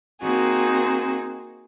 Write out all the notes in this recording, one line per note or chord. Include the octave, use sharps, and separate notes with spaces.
A#3 C4 D#4 F#4 G#4